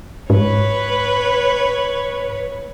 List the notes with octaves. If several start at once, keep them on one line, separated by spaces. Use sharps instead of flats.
G#2 B4 C#5